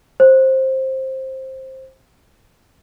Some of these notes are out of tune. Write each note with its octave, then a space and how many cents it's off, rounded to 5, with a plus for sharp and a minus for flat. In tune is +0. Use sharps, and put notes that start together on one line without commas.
C5 +15